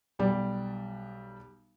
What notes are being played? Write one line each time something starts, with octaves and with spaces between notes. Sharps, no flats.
B1 G3 D5